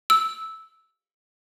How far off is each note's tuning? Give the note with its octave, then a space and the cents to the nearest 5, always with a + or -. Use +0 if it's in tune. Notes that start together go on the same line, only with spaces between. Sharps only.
E6 -10